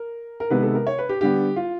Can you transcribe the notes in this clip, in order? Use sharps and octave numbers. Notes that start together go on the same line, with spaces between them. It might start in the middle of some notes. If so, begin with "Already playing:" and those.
Already playing: A#4
A#4
C3 D#3 G#3 B3 B4
A4
A#4
C#5
B4
G4
D3 G3 B3 G4
F4